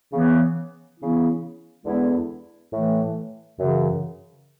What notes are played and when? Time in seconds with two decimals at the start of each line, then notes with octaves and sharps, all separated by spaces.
0.11 C#3 E3 B3
0.98 C#3 E3 B3 E4
1.85 E2 D3 G#3 B3 E4
2.72 A2 E3 A3
3.58 F#2 C#3 E3